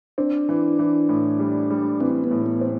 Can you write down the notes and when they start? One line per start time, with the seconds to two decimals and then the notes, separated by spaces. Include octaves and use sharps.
0.18 C4 D4
0.49 E3
0.79 E3
1.09 A2
1.39 G3
1.70 G3
2.00 E3 C4
2.24 B3
2.31 A2
2.46 B3
2.61 C4